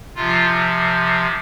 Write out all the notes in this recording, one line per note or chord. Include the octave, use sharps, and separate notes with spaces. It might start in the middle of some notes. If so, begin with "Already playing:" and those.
C3 F3 F4